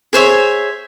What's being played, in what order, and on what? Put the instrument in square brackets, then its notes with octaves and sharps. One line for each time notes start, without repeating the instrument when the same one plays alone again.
[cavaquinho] G#4 C5 C#5 E5